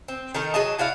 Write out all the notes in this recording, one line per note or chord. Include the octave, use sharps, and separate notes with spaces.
C4
D#3 D#4 A4 A#4
F#3 G#4 D#5 A5
E4 F#4 D5 F5